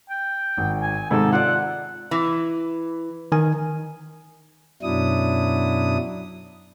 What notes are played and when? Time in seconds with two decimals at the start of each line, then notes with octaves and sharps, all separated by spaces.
0.10 G5
0.57 G#1
0.82 G#5
1.11 G#2 C3 D#3 A4
1.32 F4 D5 F#5
2.11 E3
3.32 D#3 G#5
4.83 F#2 B2 F#3 D4 E4 D#6